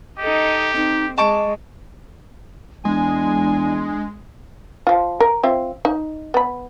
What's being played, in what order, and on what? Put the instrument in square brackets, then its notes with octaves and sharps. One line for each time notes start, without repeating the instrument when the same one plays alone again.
[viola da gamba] D#4 A4 D#5 [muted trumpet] G4
[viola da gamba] C4 [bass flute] D#4
[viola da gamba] G#3 [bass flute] D#5 [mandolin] A5 C#6 D6
[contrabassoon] E2 [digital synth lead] G#3 [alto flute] D4 [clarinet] G#5
[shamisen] F3 F4
A#4
C4 F4 E5
D#4
B3 B5